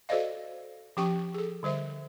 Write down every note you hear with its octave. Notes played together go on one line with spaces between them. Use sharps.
F#4 A4 C5 D5 D#5 F5
F3 C#4 G4 G5 C#6
G#4 A4
D3 G3 C5 E5